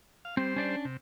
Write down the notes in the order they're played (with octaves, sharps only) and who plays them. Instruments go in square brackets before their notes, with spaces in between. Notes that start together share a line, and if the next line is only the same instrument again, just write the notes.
[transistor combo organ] F5
[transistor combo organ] G3 C5 [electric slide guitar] C4
[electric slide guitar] C#4 D4 D5
[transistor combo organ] C3